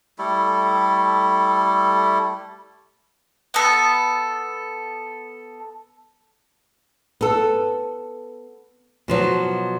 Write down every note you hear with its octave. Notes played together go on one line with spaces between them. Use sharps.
G3 A3 E4 A4
B3 A4
B3 A4
B2 F3 F#3